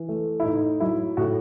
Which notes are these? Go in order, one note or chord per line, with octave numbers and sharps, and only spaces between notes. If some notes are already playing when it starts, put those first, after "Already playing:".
Already playing: E3
A3
E4
A2 D#4
F#3 E4
A2 F#4